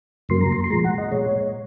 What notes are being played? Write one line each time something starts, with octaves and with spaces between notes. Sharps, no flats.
F#2 C#3 F#3 A#3 C6
A#5
C6
C6
A#2 F3 G#3 A#5
F#5
D#5
A#2 G#3 C#5